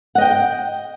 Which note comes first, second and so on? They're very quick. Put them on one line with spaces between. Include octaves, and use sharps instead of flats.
F#5 D#5 G5